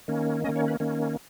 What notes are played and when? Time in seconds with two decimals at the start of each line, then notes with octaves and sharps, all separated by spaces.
0.08 D#3 A#3 C#4
0.44 D#3 A#3 C#4 D#5
0.56 C#5
0.68 B4
0.80 D#3 A#3 C#4